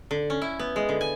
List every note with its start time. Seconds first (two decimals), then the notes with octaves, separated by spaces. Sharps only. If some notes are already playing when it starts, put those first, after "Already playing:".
0.11 D3
0.30 C#4
0.42 E4
0.59 B3
0.76 G#3
0.89 D3
1.01 G#5